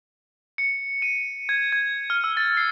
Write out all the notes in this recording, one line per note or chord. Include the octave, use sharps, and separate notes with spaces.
C#7
D#7
G#6
G#6
F6
E6
A6
C7